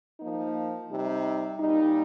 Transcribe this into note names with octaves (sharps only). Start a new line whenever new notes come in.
F3 A#3 D#4
C3 G3 D#4
A#2 G3 D#4